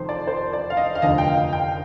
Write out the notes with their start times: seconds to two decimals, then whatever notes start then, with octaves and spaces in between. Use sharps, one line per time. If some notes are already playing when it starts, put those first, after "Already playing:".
Already playing: F1 F2 D#3 C5
0.09 D5
0.27 C5
0.53 D5
0.70 F5
0.77 D#5
0.95 F5
1.02 F1 D#2 D3 F3 D#5
1.18 G5
1.28 F5
1.53 G5